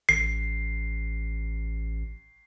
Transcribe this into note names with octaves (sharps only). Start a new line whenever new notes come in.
A1 C7